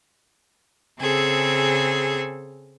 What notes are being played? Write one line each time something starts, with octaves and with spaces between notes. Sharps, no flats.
C#3 C4 G#4 A4